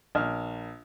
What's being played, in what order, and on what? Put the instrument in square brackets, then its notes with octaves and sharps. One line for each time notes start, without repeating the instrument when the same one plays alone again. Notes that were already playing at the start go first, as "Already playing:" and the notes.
[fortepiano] A#1 F6